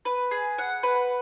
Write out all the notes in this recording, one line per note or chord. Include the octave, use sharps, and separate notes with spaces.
B4
G#4
F#5
B4